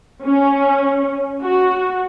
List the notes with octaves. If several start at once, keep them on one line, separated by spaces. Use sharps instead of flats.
C#4
F#4